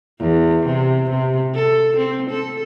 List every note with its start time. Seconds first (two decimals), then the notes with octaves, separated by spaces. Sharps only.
0.20 E2
0.67 C3
1.10 C3
1.55 A4
1.97 C4
2.30 A4